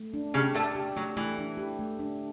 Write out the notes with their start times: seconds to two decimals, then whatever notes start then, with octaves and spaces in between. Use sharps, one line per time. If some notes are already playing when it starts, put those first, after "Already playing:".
Already playing: A3
0.14 D4
0.34 C#3 C#4 G4
0.55 A2 A3 D5
0.75 G4
0.96 F#3 A3
1.17 E3 A3
1.38 D4
1.57 G4
1.79 A3
1.99 D4